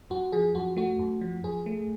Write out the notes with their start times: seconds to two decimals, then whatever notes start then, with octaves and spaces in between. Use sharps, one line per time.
0.10 F#2 F#4
0.32 F3 G#4
0.55 F#2 F#4
0.77 A3 F#4
0.99 F#2
1.21 F3
1.44 F#2 G#4
1.66 A3